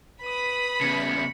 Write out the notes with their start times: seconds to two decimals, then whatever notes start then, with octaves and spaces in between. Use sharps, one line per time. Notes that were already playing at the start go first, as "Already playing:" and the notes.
0.22 B4 B5 D#6
0.81 E2 C#3 C#7